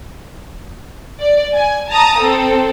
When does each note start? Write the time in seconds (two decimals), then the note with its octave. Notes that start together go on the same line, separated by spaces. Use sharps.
1.20 D5
1.54 G#5
1.90 A5 A#5 D#6
2.20 C4 A4